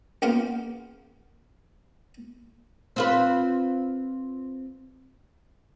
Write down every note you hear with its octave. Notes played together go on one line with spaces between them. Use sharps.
C#2 A#3 B3 F4 F5
C4 F4 B4